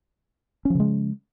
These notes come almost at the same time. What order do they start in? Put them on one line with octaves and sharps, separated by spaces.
C#4 F3 C#3 G#3